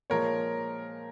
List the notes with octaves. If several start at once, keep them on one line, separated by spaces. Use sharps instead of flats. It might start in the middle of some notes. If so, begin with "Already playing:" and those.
A#2 F3 G#3 A#4 C#5